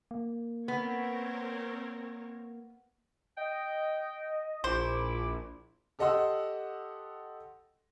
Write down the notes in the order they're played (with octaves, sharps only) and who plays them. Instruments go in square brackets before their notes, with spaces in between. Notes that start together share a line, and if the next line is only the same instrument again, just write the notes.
[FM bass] A#3
[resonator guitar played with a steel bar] B3 [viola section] C4 A#4 C#5
[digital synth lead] D#5 [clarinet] G5
[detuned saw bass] A#1 [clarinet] E4 [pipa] C5 [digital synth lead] D6
[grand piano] G4 A4 D#5 F#5 C6 E6